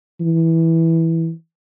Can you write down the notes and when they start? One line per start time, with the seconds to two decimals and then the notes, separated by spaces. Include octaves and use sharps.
0.20 E3